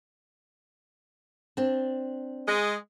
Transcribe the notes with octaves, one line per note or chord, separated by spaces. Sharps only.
C4 D4
G#3